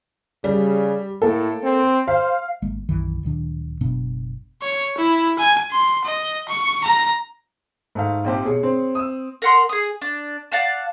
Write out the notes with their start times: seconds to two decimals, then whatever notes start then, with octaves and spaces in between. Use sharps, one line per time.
0.44 C#3 G3
1.22 A2 A#3 A4
1.63 C4
2.08 C5 F5
2.62 G#1 G#3 A#3
2.89 B1 F#2 D#3 E3
3.23 D1 A#2 D#3 D4
3.81 F#1 B2 B3 D4
4.62 C#5
4.98 E4
5.39 G#5
5.72 C6
6.05 D#5
6.49 C#6
6.84 A#5
7.95 G#2 A3 F5
8.24 A#1 C4 G4
8.45 B2 G#4 C#5
8.63 C4
8.95 D#6 E6
9.42 A#4 F#5 C6
9.69 G#4 D#6
10.02 D4
10.52 D5 F5 F#5 A5